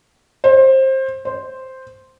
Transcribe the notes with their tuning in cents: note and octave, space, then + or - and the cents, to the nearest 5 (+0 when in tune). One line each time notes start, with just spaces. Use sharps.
C5 +20
C5 -5